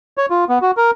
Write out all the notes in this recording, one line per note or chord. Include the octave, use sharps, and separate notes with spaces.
C#5
F4
B3
F#4
A#4